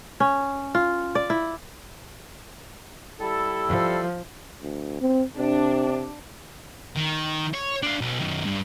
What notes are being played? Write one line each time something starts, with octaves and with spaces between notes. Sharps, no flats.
C#4
F4
D5
E4
G3 E4 A4
F3
D2
C4
C3 D4
D#3
C#5
D4 F5
B1 B2
F#2 D#3
G2